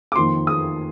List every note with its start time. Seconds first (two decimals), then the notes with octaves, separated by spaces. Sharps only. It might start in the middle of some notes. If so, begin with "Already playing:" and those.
0.12 D6
0.16 F2 D#3 A#3 C6
0.47 D#6